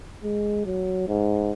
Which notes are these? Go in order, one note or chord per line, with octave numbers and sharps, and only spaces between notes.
G#3
F#3
G#2